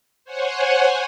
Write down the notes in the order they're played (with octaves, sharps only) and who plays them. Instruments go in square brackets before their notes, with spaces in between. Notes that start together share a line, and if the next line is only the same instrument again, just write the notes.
[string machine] C5 C#5 F#5 G#5